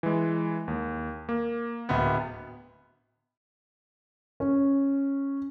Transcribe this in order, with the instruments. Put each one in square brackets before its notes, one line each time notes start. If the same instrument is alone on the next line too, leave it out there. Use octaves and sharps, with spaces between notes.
[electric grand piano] E3 G#3
D#2
A#3
[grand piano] D1 D2 B3
[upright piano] C#4